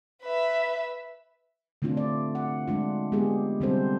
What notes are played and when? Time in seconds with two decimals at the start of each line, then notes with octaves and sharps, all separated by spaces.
0.23 B4 E5
1.82 D3 A3 C4 D4 F4
1.97 D5
2.35 F#5
2.68 G#3 D4 F4
3.12 G#3 B3 G4 G#4
3.60 D3 G3 C4 D4 A4 C5